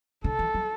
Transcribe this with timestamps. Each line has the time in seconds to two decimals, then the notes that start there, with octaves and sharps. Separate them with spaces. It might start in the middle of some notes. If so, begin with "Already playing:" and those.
0.24 D3 A4
0.39 E3
0.54 F#3